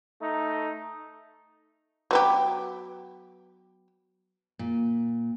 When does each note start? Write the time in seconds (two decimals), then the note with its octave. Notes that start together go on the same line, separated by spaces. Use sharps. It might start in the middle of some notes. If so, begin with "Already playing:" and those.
0.20 A3 D#4
2.11 F#3 B3 G4
4.59 A#2